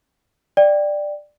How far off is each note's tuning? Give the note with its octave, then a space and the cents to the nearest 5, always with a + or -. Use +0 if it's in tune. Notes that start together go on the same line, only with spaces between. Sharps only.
D5 +10 G5 +0